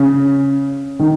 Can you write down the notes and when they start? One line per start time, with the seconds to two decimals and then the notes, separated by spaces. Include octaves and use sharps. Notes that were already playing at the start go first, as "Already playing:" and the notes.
Already playing: C#3
0.99 D#3